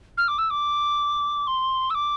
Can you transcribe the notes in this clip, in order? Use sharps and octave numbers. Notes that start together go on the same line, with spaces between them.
F6
D6
E6
D6
C6
E6
D6